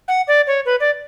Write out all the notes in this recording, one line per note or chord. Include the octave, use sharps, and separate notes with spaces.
F#5
D5
C#5
B4
D5